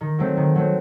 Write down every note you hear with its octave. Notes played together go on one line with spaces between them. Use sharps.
D#3
F#3 A3 C4
D#3
F#3 A3 C4